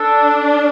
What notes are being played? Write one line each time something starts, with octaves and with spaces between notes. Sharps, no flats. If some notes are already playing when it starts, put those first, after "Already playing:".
Already playing: D4 A4